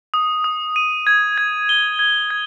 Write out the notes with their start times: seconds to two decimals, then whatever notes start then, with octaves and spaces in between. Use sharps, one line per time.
0.14 D#6
0.44 D#6
0.76 D#7
1.07 G#6
1.38 G#6
1.69 G7
1.99 G#6
2.30 G#6